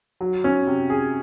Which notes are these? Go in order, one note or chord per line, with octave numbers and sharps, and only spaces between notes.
F#3
C#4
C3
G#4